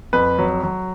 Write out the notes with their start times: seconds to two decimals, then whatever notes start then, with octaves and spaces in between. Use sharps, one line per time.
0.13 F2 B4
0.39 F#3
0.63 F#3